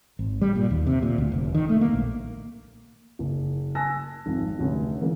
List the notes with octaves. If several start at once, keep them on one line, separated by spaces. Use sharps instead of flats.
G#1
G3
A#2
D#2
C3
A#2
D2
F1
D#3
A3
A#3
A#1
F#1
G#5 A5 E6 F#6 A#6
G#1 F2
F1 D2 C#4
E3 G#3 A#3 C#4